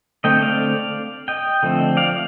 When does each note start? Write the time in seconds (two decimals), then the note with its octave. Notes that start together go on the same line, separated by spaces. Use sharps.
0.24 D3 A3 C4 D#5 G5
0.42 D5 F5
1.28 D#5 G5
1.63 D3 F3 A3 C4
1.97 D5 F5